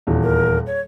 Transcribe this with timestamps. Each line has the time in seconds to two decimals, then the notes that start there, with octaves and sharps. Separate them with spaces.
0.07 D#1 E2
0.23 A#4
0.67 C#5